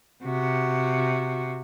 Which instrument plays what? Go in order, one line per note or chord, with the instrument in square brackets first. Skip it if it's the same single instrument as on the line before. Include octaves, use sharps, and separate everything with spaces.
[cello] C3 F#4